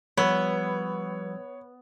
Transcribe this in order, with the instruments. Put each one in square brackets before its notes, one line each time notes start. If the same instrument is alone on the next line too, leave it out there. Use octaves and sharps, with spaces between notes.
[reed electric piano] F3 G3 E6 [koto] B3 [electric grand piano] C#5